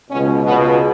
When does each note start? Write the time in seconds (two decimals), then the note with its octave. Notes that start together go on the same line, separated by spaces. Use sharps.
0.10 C#2 B2 C#4
0.44 C#2 B2 B3